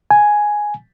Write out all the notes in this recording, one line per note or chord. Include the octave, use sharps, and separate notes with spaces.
G#5